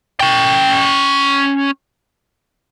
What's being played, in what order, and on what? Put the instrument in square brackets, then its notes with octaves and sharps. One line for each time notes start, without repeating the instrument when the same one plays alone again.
[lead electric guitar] C#4 G5